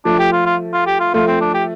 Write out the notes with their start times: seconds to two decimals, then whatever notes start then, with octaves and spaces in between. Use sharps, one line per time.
0.05 F3 A3 D4
0.19 G4
0.32 F4
0.46 F4
0.73 F4
0.87 G4
1.00 F4
1.14 F3 A3 F4
1.27 C4
1.41 D4
1.54 G4